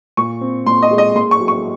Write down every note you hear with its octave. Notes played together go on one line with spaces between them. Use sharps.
A#2 C#6
C4
A#2 C6
D#5
G#3
D#5
A#3 C6
C#6
F#3
C#6